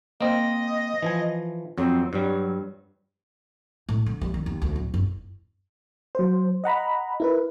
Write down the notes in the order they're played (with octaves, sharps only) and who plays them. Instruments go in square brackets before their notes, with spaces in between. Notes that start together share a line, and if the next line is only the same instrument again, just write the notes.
[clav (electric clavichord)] A#3 C4 [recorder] D#5
[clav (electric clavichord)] E3 F3 G#5
[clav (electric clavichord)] F2 F#3 [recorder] C4
[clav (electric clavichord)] G2 G3 [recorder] F#3
[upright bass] A2
D3
G3
D#3
D#2
D2
D1
F#1
[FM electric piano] F#3 C5
D#5 F#5 A#5 B5
E4 A#4 B4